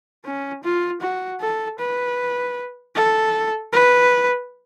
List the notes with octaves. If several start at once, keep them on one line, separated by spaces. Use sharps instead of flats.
C#4
F4
F#4
A4
B4
A4
B4